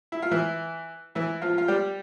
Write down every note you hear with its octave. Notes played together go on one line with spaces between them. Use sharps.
E4
F4
E3 E4
E3 E4
F3 F4
F4
G3 G4